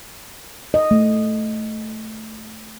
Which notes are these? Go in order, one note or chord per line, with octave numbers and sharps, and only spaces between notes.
D#5
A3